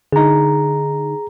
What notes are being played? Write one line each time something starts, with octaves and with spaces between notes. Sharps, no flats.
D3 D#4 G#4 A#5